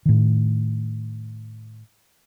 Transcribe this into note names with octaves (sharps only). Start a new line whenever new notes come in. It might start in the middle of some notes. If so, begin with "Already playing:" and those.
A2 D#3